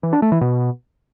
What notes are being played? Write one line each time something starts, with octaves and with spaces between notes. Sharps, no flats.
E3
D4
A3
E3
B2